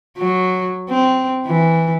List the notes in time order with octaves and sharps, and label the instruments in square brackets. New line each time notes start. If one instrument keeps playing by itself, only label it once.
[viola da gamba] F#3
C4
E3